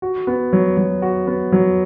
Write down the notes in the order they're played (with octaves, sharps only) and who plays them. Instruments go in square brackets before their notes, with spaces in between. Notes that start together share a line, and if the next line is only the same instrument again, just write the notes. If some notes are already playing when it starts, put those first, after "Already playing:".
[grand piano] F#4
B3
F#3
F#3
F#4
B3
F#3